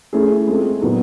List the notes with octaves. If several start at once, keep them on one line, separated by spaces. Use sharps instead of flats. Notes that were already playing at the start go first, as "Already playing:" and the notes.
A3 C#4 E4 G#4
G#3 C4 F4 A4
A#2 F#3 B3 D#4